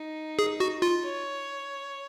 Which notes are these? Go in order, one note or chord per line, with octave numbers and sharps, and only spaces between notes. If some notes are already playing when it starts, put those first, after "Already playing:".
Already playing: D#4
G#4
F#4
F4
C#5